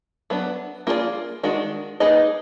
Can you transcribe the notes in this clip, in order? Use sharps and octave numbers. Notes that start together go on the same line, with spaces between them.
F#3 B3 D4
A#3 F4 G#4 B4 D5
D#3 G#3 D4 F#4
A#3 D#4 G#4 B4 D#5